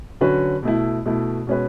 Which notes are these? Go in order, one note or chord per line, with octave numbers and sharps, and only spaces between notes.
D3 F#3 C#4 F#4 B4
B2 A3 E4
B2 A3 E4
B2 G#3 C#4 F#4 B4